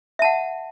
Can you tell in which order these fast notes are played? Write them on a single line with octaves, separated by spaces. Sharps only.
E5 A5 F#5